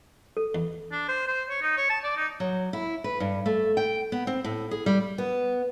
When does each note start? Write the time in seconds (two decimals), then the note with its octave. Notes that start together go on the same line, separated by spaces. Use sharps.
0.37 A4
0.55 E2
0.92 D4
1.09 C5
1.27 C5
1.50 C#5
1.62 D#4
1.77 C#5
1.90 A5
2.04 D5
2.17 D#4
2.40 F#3
2.73 E4
3.04 B4
3.20 G2
3.46 A3
3.77 G5
4.12 B3
4.27 C4
4.44 A2
4.71 G#4
4.86 G3
5.18 B3